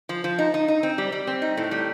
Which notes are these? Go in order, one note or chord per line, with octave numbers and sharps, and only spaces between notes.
F3
F3
D#4
D#4
D#4
C4
G3
G3
C4
D#4
A2
G3